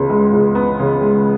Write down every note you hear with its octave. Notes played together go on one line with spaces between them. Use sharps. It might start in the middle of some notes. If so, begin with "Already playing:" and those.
Already playing: C#2 C#3 B3
G#3
C#2
B3
C#3
G#3